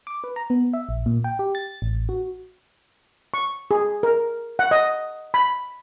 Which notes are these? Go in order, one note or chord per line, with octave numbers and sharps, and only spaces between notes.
D6
B4
A#5
B3
E5
A#1
A#2
G5
G4
A6
A1
F#4
C#6
G#4
A#4
F#5
D#5
B5